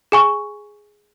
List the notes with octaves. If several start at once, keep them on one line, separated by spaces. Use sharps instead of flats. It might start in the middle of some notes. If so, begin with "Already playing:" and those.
G#4 G#5 C#6